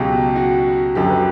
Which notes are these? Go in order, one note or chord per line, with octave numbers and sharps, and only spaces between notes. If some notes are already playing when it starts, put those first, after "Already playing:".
Already playing: C#2 B2 F#3 G4
F#4
F#2 D3 F#3 G4
B4